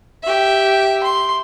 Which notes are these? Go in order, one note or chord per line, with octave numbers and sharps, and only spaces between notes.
G4 E5
C6